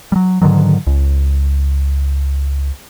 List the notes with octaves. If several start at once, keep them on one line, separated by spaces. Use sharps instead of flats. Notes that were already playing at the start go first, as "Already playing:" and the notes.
F#3 G3
G#2 D3 D#3 F#3
C#2